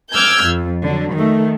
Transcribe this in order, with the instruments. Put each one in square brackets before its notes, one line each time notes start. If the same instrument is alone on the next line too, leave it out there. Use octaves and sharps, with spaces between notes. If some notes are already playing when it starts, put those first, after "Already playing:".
[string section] D6 E6 F6 G6 G#6
F2
D3 F#3
D#3 A3